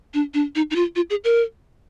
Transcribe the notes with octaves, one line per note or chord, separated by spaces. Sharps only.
D4
D4
D#4
D#4
F4
F4
G#4
A#4